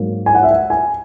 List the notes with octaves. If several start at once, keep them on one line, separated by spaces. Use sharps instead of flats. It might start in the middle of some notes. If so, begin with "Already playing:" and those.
Already playing: G#2 F#3 A#3
G#5
F#5
E5
F#5
G#5